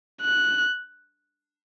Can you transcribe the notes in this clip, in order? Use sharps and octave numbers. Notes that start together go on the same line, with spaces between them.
F#6